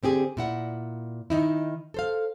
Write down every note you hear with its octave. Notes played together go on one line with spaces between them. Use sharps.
D3 C4 G4 G#4
A#2 E4 F#5
D#3 D#4 E4
A4 C5 F5